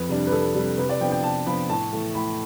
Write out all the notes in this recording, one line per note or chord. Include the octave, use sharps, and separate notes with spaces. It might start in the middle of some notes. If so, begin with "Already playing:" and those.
Already playing: F2 B4
C3 G3 D4
B4
F2 A4
C3 G3 D4
C3 B4
D5
F3 B3 D4 G5
G5
C3 A5
F3 B3 D4 B5
A2 A5
E3 A3
A2 B5